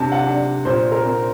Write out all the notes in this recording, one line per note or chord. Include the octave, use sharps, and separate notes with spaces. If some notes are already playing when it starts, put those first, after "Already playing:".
Already playing: C3 D4 A5
F#5
D4
A#2 C5
A#4
C4